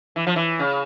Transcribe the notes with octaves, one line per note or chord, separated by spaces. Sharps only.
E3
F3
E3
C#3